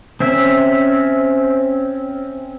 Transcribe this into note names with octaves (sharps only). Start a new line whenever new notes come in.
C4 C#4 E5